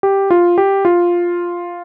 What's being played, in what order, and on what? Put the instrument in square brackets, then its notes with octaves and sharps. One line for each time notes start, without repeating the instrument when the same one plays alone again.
[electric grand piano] G4
F4
G4
F4